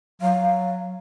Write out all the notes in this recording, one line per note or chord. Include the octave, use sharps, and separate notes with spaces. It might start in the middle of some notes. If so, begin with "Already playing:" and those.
F#3 F5